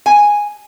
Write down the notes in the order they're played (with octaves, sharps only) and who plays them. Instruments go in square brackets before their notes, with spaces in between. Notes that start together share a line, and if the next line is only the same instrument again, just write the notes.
[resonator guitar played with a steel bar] G#5